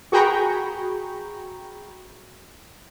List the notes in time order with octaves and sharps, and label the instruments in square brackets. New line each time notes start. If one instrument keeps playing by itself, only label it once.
[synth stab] F#4 G#4 G5 A#5 B5 C#6